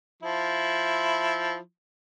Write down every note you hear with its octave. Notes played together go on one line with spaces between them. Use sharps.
F3 E4